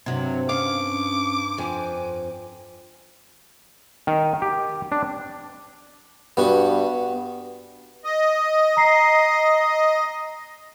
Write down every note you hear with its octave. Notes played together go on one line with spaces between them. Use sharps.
G2 C3 F#3
C#4 F5 D6
F2 G#5
D#3
G4
D4
G2 B3 F#4
D#5
A#5 C7